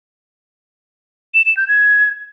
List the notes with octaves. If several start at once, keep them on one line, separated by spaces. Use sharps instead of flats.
E7
E7
G6
G#6